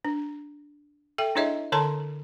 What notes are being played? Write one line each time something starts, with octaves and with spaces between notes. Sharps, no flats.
D4
A4 E5 G5
D4 E4 G#4 C#5 D#5 E5
D3 A4 C#5 A5 A#5 C6